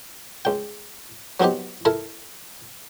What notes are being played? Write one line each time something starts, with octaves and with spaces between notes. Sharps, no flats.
C#2 G5
F#3 B3 C4 D#4 G4
E4 A4 A#4